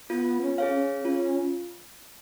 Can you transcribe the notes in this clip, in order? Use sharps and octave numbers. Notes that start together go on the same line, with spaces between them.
B3 F4
C#4
G#4 C#5 F5
C#4
C#4 F4